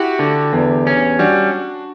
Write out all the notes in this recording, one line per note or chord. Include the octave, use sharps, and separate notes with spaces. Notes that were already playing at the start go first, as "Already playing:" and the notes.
Already playing: E4 F#4 G4
D3
E2
C#4
G3 D4 F#4